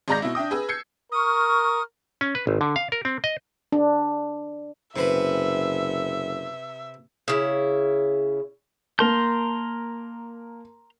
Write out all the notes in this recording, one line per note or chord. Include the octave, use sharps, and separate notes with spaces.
G#1 G#3 D5 A#5 G6 A#6
B2 E4
D4 E5 G5 D#6
G#4 B4 G#5 E6
E6 G6 G#6 C7 C#7
A#4 C#6 D#6 F6
C#4
B4
G#1
D3
F5
A#4
C4
D#5
D4
F#1 C3 B4 E5
C#3 E4
A#3 A#4 A5 A#5 C6 G6